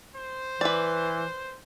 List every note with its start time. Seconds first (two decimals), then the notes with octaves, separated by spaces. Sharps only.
0.16 C5
0.61 E3 B4 D5